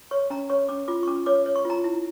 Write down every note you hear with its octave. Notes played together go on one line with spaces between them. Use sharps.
C#5 C#6
C#4 A#5
C#5 C#6
C#4 D6
F4 D6
C#6
C#4 D6
C#5 D6
C#5
C#6
F4 A#5
E4